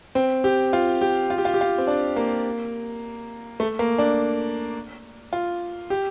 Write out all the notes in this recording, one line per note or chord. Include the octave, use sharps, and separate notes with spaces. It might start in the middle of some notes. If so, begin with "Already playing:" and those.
C4
G4
F4
G4
F4
G4
F4
G4
F4
C4
D4
A#3
A3
A#3
D4
F4
G4